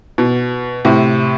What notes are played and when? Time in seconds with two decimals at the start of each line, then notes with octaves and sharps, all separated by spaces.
0.18 B2
0.85 A2 C3